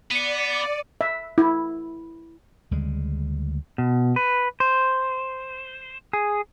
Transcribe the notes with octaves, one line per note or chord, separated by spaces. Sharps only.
B3 D5 C#7 D#7
E5
E4
D2 C#3 G3 G#3
B2
B4
C5
G#4